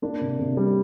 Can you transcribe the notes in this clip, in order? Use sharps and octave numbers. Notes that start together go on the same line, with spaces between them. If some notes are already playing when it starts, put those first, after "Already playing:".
A#3 D4
C3
C3
G3